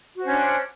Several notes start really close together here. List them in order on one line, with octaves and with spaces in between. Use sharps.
F#4 C5 C#4 D4